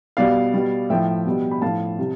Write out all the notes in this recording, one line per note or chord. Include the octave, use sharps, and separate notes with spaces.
B2 G3 D5 F5
B2 G3
A2 F3 E5 G5
B2 G3
B5
A2 F3 F5 A5
C3 G3